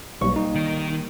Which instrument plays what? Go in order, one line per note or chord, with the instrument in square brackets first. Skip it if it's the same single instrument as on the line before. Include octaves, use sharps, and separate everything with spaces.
[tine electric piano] B1 C#6 [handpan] G3 A#3
[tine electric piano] D#4
[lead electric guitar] D#3